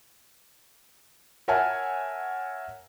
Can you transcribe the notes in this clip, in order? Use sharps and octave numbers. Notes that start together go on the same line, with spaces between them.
A#4 C#5 E5 F#5 G#5 A5